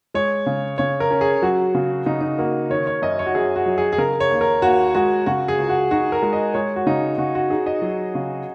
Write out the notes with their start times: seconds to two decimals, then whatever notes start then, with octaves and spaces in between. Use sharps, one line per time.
0.14 G#3 C#5
0.46 C#3
0.78 C#3 C#5
1.00 A#4
1.11 C#4
1.21 G#4
1.42 F#3 F#4
1.75 C#3
2.06 C#3 D#4
2.21 D#4
2.38 A#3 F#4
2.70 D#3 C#5
2.87 C#5
3.02 F#2 D#5
3.19 C#5
3.26 F#4
3.34 F#2 G#4
3.56 F#4
3.66 F#3
3.78 G#4
3.93 G#4
3.98 C#3 A#4
4.20 C#5
4.31 D#2
4.41 A#4
4.62 D#2 F#4
4.95 G#3 F#4
5.26 C#3 F#4
5.48 G#4
5.58 C#2
5.69 F#4
5.91 D#4 F#4
6.12 A#4
6.22 G#3
6.33 D#5
6.54 G#3 C#5
6.76 F#4
6.86 C#3 D#4
7.18 C#3 F#4
7.35 F#4
7.50 D#4 G#4
7.66 D#5
7.82 F#3
8.15 C#3